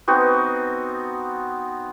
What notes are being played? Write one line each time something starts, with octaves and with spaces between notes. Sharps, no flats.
B3 C4 D#4 F#4